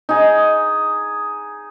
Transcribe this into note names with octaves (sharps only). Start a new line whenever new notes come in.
D#4 G#4